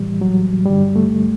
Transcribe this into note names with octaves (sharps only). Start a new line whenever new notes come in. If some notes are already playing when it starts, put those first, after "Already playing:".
Already playing: A2 E3 G3
F#3
G2 D3 G3
A3